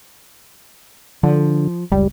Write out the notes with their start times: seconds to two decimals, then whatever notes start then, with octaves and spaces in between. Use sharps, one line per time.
1.23 D3 F3
1.92 F#1 C#2 G3